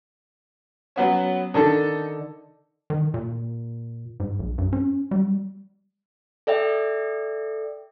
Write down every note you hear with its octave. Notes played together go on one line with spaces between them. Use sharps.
F#3 B3 C#4
D3 D#3 D4 D#4 A4
D#3
A#2
G#2
B1
G2
C#4
G3
A4 D5 E5 G5